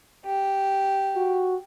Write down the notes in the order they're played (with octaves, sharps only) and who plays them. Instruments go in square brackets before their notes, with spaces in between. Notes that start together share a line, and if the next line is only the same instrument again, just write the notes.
[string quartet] G4
[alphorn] F#4